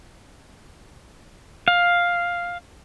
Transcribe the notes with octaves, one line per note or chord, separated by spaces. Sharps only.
F5